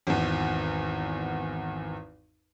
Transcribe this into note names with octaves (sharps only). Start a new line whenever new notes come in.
G#1 E2